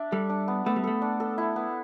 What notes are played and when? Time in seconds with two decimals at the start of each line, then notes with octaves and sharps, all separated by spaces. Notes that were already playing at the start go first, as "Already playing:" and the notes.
Already playing: D4 E5
0.12 G3 A4
0.29 D4
0.48 B3
0.66 A3 B3
0.76 G3
0.84 A3 A4
1.02 D4
1.20 A4
1.38 E4
1.56 B3